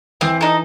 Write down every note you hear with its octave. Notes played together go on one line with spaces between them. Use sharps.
E3 C4
D#4 A4